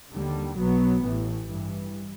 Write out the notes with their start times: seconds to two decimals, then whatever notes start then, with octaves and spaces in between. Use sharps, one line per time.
0.12 D#2 D3 G3
0.57 B1 B2 F#3 B3
1.02 A1 A2 E3
1.47 G2 E3 G3